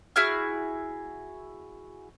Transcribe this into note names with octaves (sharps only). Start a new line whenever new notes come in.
E4 F#4 G#4 F6